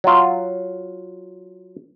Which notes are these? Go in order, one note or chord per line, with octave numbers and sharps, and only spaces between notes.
F#3 F4